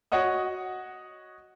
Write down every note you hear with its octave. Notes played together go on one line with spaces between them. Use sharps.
F#4 C#5 D#5 F#5 D#6